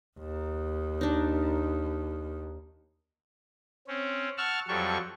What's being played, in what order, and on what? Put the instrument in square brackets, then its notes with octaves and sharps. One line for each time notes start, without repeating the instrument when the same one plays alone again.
[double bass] D#2
[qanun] D4 D#4
[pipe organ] C4 C#4
F#5 A5 C#6 E6 F6
F2 F#3 G3 A4 C#6